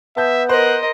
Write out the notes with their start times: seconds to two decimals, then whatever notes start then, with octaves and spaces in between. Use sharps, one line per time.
0.17 B3 E5 A5 G6
0.49 A#4 C5 D#5 F#6